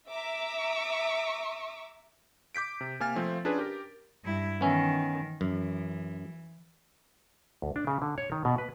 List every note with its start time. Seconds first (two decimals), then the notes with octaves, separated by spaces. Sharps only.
0.10 E5 A#5 D6 E6
2.55 D6 G6 B6 D7
2.81 C3
3.00 C3 A#3 G#5 F6 A6
3.15 F3 A3 C4 F4
3.45 C#4 D4 F4 G#4 B4
3.59 G4 A#4
4.25 G2 E4
4.61 D#3 E3 B3 C#4 E5
5.41 F#2 E3
7.62 D2
7.76 D4
7.87 C#3
8.02 D3
8.18 C#5
8.32 D#3
8.45 B2
8.58 B4